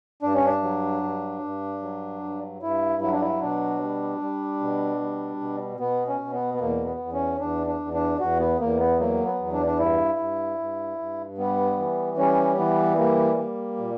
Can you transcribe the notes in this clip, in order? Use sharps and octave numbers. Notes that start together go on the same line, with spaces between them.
G2 D4
C#4
D4
F#3
G2
G2
F#3
G2
G2 E4
F#3 E4
D4
E4
B2 D4
G3
G3
B2
G3
B2
B2 B3
C#4
B2
B3
B3
E2 A#3
B3
E2
C#4
E2 D4
D4
E2
D4
E2 F#4
B3
E2 A#3
B3
F#3 A#3
B3
E2
D4
D4
G2 E4
G2
G2
G2
G3 B3
E3
G3 C#4
E3 B3
G3 A#3
G3
A#2